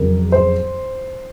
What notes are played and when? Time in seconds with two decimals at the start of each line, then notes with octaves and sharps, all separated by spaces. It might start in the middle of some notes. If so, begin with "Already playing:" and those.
Already playing: F2 C#3 F#3 A#4
0.32 C5